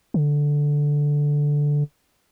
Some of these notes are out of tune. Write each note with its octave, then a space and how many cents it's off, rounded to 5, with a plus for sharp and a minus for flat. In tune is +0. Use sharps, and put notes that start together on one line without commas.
D3 -5